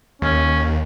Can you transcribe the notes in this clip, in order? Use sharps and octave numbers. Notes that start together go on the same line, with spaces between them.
D#2 C#4